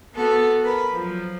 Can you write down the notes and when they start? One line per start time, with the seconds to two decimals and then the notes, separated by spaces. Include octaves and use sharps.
0.15 B3 F#4 A4
0.63 A#4 B4 B5
0.92 F3 F#3